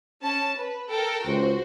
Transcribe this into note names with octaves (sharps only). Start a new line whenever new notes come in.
C#4 A5
B4
A4 A#4 G5
C#2 F#4 C5